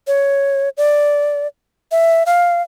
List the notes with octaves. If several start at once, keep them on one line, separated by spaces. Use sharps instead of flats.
C#5
D5
E5
F5